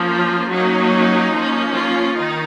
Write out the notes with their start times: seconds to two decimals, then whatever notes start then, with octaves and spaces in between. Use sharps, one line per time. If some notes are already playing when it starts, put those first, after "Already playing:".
Already playing: F3 A#3 C#4
0.09 F4
0.50 F#3 A#3 C#4 D#4
1.33 F3 A#3 C#4
1.74 F4
2.16 D#3 D#4